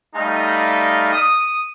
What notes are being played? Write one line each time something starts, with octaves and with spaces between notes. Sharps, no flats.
G3 A3 D#4 D#5 F5
D#6